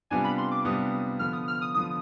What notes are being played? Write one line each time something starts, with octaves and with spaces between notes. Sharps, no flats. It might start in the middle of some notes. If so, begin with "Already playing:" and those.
C3 G3 B3 D4 F4 G#5
B5
C6
D6
C3 G3 B3 D4 F4 D#6
D3 F3 B3 F6
D#6
F6
D#6
D3 F3 B3 D#6